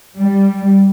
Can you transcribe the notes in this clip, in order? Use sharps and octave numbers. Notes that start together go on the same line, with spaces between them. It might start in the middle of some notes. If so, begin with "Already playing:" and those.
G3